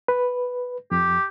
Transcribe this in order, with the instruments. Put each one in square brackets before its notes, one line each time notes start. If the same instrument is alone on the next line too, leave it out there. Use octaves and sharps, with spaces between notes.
[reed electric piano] B4
[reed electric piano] F2 [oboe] G4